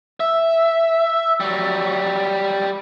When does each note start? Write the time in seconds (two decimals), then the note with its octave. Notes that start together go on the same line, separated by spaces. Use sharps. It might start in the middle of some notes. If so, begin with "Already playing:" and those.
0.20 E5
1.40 F#3 G3